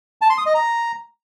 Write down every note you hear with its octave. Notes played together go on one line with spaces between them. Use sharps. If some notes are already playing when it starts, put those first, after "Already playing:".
A5
C6
D#6
D#5
A#5